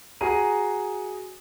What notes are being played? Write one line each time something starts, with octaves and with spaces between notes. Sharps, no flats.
F#4 G#4 A#5 D#7